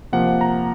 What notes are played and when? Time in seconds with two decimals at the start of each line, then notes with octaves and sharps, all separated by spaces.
0.12 C3 F3 A#3 F#5
0.41 A#5